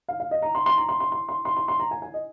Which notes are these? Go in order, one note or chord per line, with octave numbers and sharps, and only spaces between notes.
F5
F5
D#5
A#5
C6
C6
A#5
C6
C6
C6
C6
C6
C6
C6
A#5
G#5
G#5
D#5